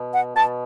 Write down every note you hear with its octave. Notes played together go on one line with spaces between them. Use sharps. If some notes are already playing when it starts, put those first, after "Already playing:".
Already playing: B2
F#5
B2 A5